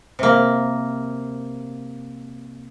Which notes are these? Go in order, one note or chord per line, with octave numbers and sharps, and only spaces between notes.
C3 A#3